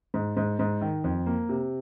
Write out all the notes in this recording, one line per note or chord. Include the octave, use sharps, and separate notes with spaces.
G#2
G#2
G#2
D#3
F2
A#3
C3